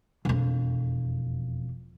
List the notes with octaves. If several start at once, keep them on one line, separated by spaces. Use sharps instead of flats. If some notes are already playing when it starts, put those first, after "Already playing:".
E1 F2